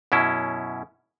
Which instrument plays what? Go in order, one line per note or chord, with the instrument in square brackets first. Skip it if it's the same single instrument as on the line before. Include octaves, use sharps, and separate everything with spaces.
[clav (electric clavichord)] F#2 B2 C#4 E4